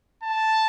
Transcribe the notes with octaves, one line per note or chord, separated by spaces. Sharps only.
A5